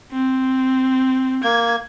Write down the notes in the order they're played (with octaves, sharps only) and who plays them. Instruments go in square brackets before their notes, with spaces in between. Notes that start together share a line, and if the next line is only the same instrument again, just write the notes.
[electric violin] C4
[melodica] A#3 [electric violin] G#6